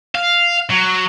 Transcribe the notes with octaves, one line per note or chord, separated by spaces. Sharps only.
F5
F#3